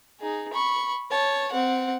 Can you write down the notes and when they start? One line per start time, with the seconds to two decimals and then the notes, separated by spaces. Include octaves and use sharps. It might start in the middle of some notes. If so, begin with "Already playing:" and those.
0.20 D#4 G#4
0.53 B5 C#6
1.11 C#5 A5
1.51 C4 F#5